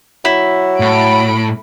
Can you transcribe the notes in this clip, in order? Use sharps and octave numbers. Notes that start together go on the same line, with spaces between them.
F#3 E4
A2 B5 D7